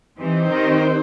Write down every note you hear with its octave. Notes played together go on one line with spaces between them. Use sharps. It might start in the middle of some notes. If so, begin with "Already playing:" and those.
E3 C4 D#4 G4 C5
D#3